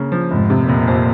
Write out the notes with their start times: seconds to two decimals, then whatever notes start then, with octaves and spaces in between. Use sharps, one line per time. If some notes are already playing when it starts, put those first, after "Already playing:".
Already playing: C#3 A#3
0.12 F3
0.31 F1 G#2
0.50 C3
0.68 F1 A#2
0.88 F2